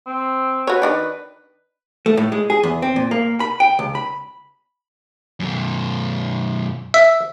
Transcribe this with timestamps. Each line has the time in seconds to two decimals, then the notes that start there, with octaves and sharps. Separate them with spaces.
0.07 C4
0.67 F#4 B4 C#5
0.82 D#3 D4 D5
2.06 A3
2.17 A2
2.32 G#3
2.50 G#4
2.63 E2
2.82 C4
2.96 A#2
3.11 A#3
3.40 B5
3.60 G5
3.79 C#2
3.95 B5
5.40 F#2 B2
6.94 E5